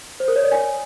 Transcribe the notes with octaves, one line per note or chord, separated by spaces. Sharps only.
C5
A#4
C#5
D5
G#5